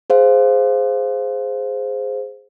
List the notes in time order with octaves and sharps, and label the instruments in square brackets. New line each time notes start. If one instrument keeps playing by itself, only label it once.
[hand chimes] G#4 C5 F5